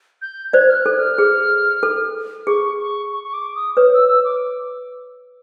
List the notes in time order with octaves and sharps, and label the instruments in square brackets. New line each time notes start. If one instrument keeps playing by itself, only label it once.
[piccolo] G6
[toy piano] C5 D5 [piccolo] G#6
[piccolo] F6
F#6
[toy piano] A4
[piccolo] F6
[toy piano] G#4
A4
[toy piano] G#4 [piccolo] C#6
[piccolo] C#6
C#6
C#6
D6
D#6
[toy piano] B4 C#5 [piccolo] D#6
[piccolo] E6
E6
D6